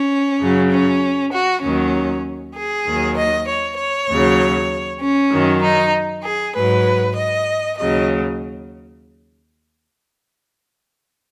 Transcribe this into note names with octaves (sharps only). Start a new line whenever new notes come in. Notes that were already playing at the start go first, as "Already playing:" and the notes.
Already playing: C#4
F#2 C#3 F#3
C#4
F#4
D#2 D#3 F#3 C#4
G#4
D#2 D#3 F#3
D#5
C#5
C#5
D#2 C#3 F#3
C#4
F#2 D#3 F#3
D#4
G#4
G#2 F#3 B4
D#5
D#2 C#3 F#3 D#5